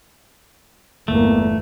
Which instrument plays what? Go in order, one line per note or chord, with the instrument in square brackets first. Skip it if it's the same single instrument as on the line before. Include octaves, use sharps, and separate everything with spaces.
[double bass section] G1 E2 A#3 [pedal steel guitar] A3